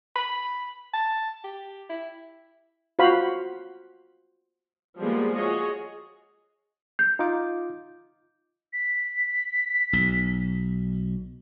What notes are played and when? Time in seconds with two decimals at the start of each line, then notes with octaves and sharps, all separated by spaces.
0.15 B5
0.94 A5
1.44 G4
1.90 E4
2.99 F4 F#4 C5 F5 B5
4.99 F3 G3 G#3 A#3 B3 G#4
5.34 F4 F#4 G#4 C#5 D#5
6.99 G6
7.19 D#4 F4 D6
8.73 B6
9.93 B1